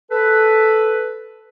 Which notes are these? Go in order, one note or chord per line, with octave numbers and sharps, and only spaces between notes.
A4 B4